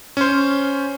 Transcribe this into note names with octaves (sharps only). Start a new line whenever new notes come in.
C#4 C5